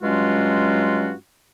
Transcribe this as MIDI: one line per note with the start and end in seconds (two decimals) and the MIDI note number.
0.02 1.13 43
0.02 1.13 54
0.02 1.13 56
0.02 1.13 61
0.02 1.13 65
0.02 1.13 66